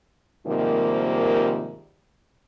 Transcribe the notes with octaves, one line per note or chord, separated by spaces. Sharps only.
G#2 C3 D#3 F3 G3 A#3